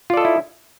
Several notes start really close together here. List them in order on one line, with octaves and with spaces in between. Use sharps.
F4 D5 A4 D#5 E4